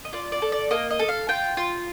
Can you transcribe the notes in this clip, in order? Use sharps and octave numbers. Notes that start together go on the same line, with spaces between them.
D#5
F4 D5
D5
A4
D5
A#3 D#5
D#5
A4
F5
F4 G5
F4